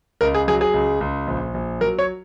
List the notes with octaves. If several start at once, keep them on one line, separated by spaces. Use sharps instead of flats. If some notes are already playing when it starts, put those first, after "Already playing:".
C#2 A#4
G#4
F#3 G#4
G#4
C#2
C#2
A#1
A#1
F#3 A#4
C#5